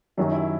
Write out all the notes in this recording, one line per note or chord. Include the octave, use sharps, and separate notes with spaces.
F#2 D#3 F#3 G4
E4